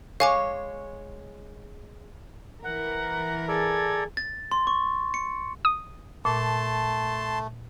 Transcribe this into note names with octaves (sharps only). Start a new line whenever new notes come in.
G#3 C#5 F5 G#5 D6
E3 A#4 F#5
G#4 A4 D5 G#5 A#5 G#6
A6
C6
C#6
C#7
D#6
A#2 A3 A5 C6